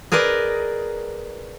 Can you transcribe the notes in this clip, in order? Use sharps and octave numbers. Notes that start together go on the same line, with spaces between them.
G#4 A#4 B4 D5 D#5